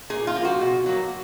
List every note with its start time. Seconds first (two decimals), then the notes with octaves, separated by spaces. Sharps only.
0.10 A#2 G#4
0.27 F4
0.35 F3 A#3
0.45 F#4
0.61 B2
0.86 F#3 A#3